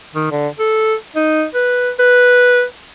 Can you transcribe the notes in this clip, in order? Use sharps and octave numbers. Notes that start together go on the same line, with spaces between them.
D#3
D3
A4
D#4
B4
B4